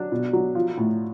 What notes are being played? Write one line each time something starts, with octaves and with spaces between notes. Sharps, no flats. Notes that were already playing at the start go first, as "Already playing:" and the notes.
Already playing: F#3 D4
B2
F#3
F3
A2